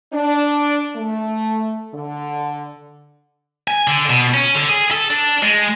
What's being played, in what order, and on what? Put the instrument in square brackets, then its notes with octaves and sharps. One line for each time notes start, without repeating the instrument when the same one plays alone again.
[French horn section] D4
A3
D3
[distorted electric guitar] G#5
D3
B2
C#4
D3
G#4
A4
D4
G#3